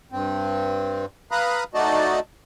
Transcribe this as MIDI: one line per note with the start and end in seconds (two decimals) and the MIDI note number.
0.12 1.06 43
0.12 1.06 60
1.31 1.64 71
1.31 1.64 77
1.31 1.64 82
1.31 1.64 83
1.31 1.64 87
1.31 1.64 90
1.74 2.20 57
1.74 2.20 63
1.74 2.20 66
1.74 2.20 74
1.74 2.20 75
1.74 2.20 81